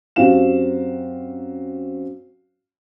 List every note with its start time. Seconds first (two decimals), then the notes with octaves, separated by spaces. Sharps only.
0.16 F#2 C4 F#4 G4 F5 E7